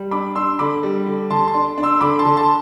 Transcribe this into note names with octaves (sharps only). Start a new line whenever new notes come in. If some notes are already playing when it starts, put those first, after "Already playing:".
Already playing: G3
D4 B5 D6
D4 C6 E6
D3 B5 D6
G3
D3
D3 A5 C6
A5 C6
D4
D4
C6 E6
D3 B5 D6
A5 C6
D3
A5 C6